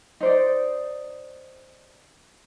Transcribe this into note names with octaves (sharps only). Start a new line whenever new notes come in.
D#4 C5 D5